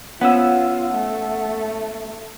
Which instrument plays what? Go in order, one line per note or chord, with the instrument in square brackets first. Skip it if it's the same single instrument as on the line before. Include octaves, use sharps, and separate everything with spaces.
[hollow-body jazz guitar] B3 C#4 [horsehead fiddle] F4 [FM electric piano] F#5 E6
[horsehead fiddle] A3